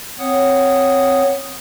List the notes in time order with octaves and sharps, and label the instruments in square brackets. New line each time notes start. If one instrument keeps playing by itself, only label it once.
[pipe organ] C4 C#5 F#5 D#6